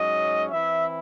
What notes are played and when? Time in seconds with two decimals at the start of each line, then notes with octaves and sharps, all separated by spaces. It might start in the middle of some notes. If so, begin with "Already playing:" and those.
Already playing: G#2 F#3 C#4 D#5
0.51 E3 C4 E4 E5